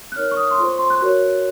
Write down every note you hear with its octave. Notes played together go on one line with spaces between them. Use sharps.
F#6
D#4 A#4 C#5 F6
C#6
D#6
C6
F4 A4 C5 C#6
C#6
C6
F#6
F#4 A#4 C#5 F#6